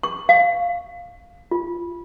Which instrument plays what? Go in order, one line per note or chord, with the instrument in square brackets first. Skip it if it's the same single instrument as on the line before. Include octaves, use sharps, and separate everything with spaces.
[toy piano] C#6
F5
F4